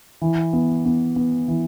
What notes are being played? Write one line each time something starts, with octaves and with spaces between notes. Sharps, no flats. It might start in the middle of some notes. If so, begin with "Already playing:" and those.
E3
B3
B3
B3
E3